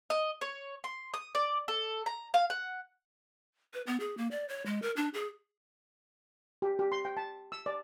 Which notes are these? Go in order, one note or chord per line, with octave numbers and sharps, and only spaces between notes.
D#5
C#5
C6
D#6
D5
A4
A#5
F5
F#5
B4
B3
G#4
A#3
D5
C#5
G#3
A#4
D4
G#4
G4
G4
C6
G5
A5
E6
D5